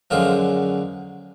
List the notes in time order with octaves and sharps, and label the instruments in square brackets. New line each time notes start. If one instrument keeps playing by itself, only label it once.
[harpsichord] F#2 D3 F3 G#3 F4